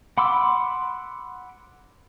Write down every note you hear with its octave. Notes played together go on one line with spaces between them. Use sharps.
F#5 B5 C6 D6 E6